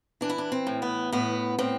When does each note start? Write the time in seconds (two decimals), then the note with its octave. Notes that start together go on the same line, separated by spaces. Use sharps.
0.21 E3 D4
0.30 E4
0.38 D4
0.52 C4
0.67 A2
0.82 B3
1.12 A2 B3
1.59 A2 C4